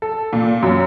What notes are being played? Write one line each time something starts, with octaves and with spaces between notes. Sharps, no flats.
A4
A#2
F#2